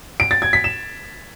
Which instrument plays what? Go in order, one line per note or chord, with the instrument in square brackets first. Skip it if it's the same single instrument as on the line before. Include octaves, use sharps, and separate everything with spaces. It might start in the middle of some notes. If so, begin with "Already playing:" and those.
[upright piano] D7
A6
G#6
B6
E7